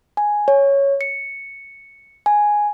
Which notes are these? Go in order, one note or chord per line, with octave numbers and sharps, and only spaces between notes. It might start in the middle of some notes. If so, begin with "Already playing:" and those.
G#5
C#5
C#7
G#5